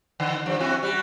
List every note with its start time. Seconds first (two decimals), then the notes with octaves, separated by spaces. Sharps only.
0.20 D3
0.46 G2 F3
0.60 C4 E4 F#4
0.83 G3 F#4